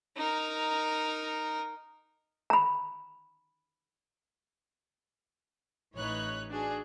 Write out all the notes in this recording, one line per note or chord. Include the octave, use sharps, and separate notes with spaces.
D#4 A#4
A#5 B5
A1 E3 D#4 B4 C#5 F#6
D4 F#4 G#4